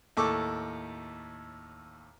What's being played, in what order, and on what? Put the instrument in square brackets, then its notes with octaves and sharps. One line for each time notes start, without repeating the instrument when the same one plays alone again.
[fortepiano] D#2 A2 A4 C#6 D6